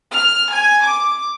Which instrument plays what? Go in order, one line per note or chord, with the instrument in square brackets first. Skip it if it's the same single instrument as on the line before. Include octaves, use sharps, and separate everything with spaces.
[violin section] F6
G#5
D6